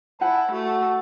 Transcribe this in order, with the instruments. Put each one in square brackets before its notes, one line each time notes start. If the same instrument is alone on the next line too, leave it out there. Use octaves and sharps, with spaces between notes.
[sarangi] E4 [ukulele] C5 F#5 G#5 [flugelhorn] A5
[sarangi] A3 [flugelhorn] F#4